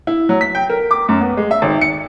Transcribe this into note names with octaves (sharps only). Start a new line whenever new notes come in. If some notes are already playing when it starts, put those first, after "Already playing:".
E4
F#3
B6
G5
A#4
D6
F#2
B3
G#3
E5
G#1
C#7